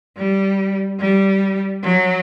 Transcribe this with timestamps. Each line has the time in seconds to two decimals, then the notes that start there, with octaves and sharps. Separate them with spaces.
0.17 G3
0.99 G3
1.83 F#3